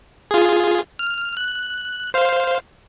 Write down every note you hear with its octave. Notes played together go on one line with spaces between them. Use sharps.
F4 G#4
F6
F#6
C5 F5